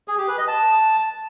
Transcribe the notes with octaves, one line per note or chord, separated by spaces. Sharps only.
G#4
G4
B4
D#5
A5